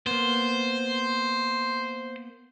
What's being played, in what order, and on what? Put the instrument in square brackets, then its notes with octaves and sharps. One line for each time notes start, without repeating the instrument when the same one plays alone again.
[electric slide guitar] A#3 B3 [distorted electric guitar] C5